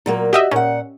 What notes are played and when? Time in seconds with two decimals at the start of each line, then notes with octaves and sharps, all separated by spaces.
0.06 A#2 F#3 A#3
0.33 F#4 G4 D#5 E5
0.51 A#2 C#4 F#5